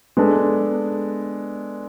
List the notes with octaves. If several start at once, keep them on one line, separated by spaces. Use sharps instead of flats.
G#3 B3 D4 A4